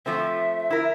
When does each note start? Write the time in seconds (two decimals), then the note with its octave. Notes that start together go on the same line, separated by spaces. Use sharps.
0.06 F3 A3 C4 E5
0.70 E4 A#4